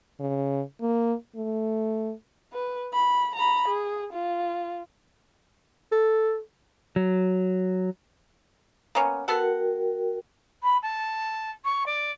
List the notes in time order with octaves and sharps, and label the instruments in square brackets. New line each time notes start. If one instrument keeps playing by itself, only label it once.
[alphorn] C#3
A#3
A3
[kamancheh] B4
B5
A#5 B5
G#4
F4
[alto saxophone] A4
[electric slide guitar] F#3
[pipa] A#3 B3 C#4
[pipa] B3 A4 F#5 [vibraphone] F#4 A#4 G5
[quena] B5
A5
C#6
D5